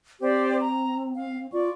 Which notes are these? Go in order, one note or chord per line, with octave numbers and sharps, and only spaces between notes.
C4 G4 C5 D5
A#5
F5
F4 D5 C#6